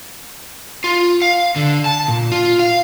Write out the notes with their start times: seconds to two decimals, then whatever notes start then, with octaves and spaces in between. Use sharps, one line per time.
0.84 F4
1.22 F5
1.56 D3
1.85 A5
2.08 A#2
2.32 F4
2.59 F5